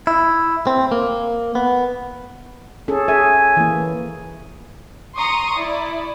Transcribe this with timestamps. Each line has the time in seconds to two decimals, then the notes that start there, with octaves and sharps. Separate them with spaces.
0.07 E4
0.67 C4
0.92 A#3
1.55 B3
2.88 C#4 G#4 A4
3.08 G#4 E5 G#5
3.57 E3 A#3
5.15 A#5 C6 C#6 D#6
5.56 E4 D5